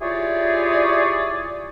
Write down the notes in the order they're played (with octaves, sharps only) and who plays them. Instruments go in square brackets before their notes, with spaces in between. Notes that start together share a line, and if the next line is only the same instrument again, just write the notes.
[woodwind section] E4 F4 G4 G#4 C#5 D5